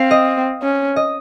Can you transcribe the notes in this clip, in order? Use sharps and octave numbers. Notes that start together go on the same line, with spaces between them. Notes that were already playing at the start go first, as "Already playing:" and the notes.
Already playing: C4 F5
D#5
C#4
D#5